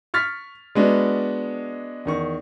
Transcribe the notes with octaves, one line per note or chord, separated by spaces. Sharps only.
C#6 F6 A6 B6
G#3 B3 D4 F#4 D5
E2 D#3 C#6